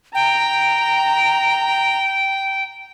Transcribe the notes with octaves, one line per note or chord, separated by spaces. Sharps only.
G5 A#5